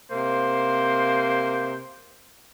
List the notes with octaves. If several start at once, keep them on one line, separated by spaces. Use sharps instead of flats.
C3 A#3 C5